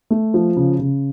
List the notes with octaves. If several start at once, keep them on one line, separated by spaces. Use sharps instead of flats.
A3
F3
C#3
C#3